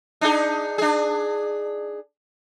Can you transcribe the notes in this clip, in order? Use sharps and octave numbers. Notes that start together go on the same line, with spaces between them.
D4 D#4 G#4
D4 G#4